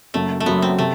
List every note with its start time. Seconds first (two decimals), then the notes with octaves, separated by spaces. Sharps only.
0.14 F#1 F#2 F#3 A3
0.40 A3
0.46 F#1 F#2 F#3 B3
0.62 C4
0.78 C3 A3